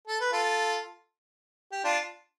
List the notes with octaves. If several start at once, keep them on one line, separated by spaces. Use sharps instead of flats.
A4
B4
F4 A4
G4
D4 F4